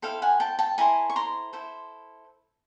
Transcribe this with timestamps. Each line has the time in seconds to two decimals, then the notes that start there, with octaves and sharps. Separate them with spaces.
0.02 E4 A4 C5 F5 G5
0.22 F#5 G#5
0.40 G5 A5
0.59 G5 A5
0.78 E4 A4 C5 G#5 A#5
1.10 C#6
1.16 A#5 C6
1.53 E4 A4 C5